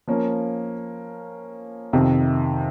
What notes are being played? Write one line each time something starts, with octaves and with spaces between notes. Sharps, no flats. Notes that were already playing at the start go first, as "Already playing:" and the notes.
F3 A#3 C#4
F2 C3 D#3